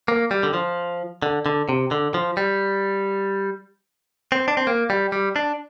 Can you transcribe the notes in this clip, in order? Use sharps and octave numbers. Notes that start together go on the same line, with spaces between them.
A#3
G3
D3
F3
D3
D3
C3
D3
F3
G3
C4
D4
C4
A#3
G3
G3
D4